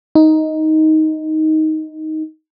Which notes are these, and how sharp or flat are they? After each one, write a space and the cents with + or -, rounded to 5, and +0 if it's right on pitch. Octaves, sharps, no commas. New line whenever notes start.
D#4 +10